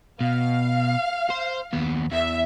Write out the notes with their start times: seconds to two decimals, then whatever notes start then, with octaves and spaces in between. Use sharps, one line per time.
0.21 B2 F5
1.30 C5
1.73 D#2 B3
2.12 E2 E5